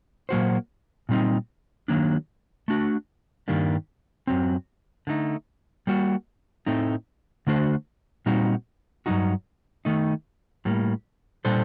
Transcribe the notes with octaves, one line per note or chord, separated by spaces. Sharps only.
A#2 F#3 A#3 F#4 C5
A#2 G3 C4 D#4
D#3 F#3 A#3 D4
A3 D4 F#4
G2 D#3 G3 A#3 D4
F#2 D#3 F#3 C4
D3 A3 D#4
G3 A#3 F#4
A2 A3 C4 D#4
D3 A3 D4 F#4 C5
A#2 G3 C4 D#4 F#4
G2 F#3 A3 D#4 F#4
D#3 A3 D#4
A2 G3 A#3
A#2 G3 D4 A4 C5